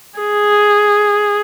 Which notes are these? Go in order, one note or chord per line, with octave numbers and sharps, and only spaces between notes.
G#4